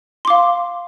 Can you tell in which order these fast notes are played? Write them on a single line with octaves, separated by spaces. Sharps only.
C6 D6 F5